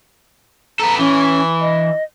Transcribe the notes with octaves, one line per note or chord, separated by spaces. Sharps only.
B3 A4 A#5
E3 C#4
D#5